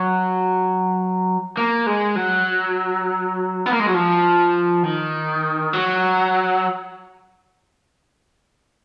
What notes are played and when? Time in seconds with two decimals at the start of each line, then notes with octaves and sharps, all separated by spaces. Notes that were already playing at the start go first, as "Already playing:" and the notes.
Already playing: F#3
1.57 A#3
1.87 G#3
2.16 F#3
3.66 B3
3.73 A#3
3.80 G#3
3.87 F#3
3.95 F3
4.84 D#3
5.73 F#3